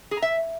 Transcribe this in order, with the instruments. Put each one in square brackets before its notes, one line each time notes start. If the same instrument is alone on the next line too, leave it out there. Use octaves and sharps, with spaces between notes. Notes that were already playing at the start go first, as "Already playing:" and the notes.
[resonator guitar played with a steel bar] G#4
A#5
E5